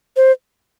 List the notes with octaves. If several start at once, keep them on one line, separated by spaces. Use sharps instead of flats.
C5